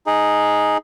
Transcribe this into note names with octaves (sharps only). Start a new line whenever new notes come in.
D#4 G#4